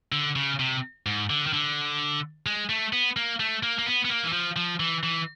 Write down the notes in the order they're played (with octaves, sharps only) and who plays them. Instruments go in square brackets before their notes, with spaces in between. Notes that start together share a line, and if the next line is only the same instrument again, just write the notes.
[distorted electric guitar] D3
C#3
C3
G#2
D3
D#3
D3
G#3
A3
B3
A#3
A3
A#3
A#3
B3
B3
A#3
E3
F3
F3
E3
E3